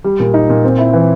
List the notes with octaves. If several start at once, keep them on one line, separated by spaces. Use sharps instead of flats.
G3
A#2
D#4
A#2
C4
E4
E3